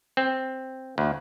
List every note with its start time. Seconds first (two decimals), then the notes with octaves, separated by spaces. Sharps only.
0.17 C4
0.98 D2